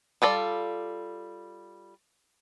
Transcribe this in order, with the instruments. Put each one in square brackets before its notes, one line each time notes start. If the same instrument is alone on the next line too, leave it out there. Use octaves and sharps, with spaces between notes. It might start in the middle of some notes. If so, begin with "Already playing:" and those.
[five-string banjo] G3 F4 A4 D5